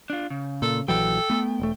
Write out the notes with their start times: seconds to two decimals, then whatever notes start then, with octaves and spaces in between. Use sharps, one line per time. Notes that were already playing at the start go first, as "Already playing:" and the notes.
0.10 D4 F4
0.30 C#3
0.62 A#2 A4
0.88 A#1 E3 F#3 A4 G5
1.30 A3 B3
1.60 E1 A3